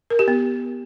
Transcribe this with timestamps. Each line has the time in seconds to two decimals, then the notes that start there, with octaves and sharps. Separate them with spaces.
0.10 A#4
0.19 G4
0.28 B3